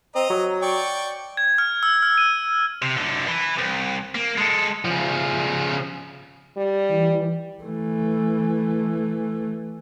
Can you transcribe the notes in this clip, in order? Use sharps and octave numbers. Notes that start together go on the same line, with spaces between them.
C4 D#5 A#5
F#3
D5 G5 C#6
G#6
F6
E6
F6
D#7
C3
F#2 D3
E3
C2
A#3
G#3 A4
C#3 F3
G3
E3
E3 A3